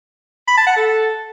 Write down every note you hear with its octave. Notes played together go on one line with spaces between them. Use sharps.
B5
A5
F#5
A4